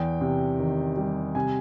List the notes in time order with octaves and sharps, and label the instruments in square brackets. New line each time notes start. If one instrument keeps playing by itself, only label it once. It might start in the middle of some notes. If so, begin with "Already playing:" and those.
Already playing: [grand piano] E2 G5
C3
D#3
G3
C3 G#5